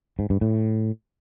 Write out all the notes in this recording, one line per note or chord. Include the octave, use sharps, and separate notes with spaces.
G#2
G2
A2